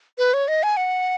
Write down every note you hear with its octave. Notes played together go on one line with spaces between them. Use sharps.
B4
C#5
D#5
G#5
F#5